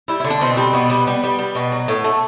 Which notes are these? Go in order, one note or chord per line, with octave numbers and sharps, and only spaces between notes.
G3 E4
D3 E4
D4
B2 C4
G3
B2 B3
G3
G3
G3
G3
B2
F#3
A2
A3